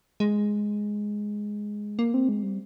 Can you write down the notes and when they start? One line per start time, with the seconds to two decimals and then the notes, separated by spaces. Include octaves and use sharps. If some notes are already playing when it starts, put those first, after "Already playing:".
0.20 G#3
1.99 A#3
2.14 C4
2.29 G#3
2.43 G3